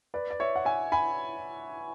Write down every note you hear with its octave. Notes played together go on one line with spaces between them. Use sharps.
B4 D5
D5
C#5 E5
F#5
E5 G#5
G#5 B5